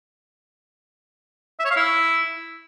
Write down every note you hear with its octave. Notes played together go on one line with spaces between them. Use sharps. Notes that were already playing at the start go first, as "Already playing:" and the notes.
E5
C#5
F5
E4